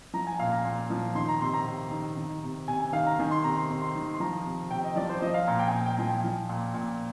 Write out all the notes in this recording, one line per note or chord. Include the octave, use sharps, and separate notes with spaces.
F3 A#5
G#5
A#2 F5
A#5
A#2
F3
D#3 C6
A#5
C3 C6
A#5
C3
D#3
D#3
C3
C3 G#5
G#5
D#3 F5
A#5
D#3 G#5
C6
C3 A#5
C6
C3
C6
D#3
C6
F3 A#5
C3
C3 G5
D#5
F3 D5
C5
F3 D#5
F5
A#2 A#5
G5
G#5
A#2 G5
G5
F3 G#5
G5
F3
A#2
A#2